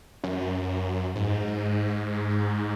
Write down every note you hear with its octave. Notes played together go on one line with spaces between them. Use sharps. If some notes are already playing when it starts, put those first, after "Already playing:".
F#2
G#2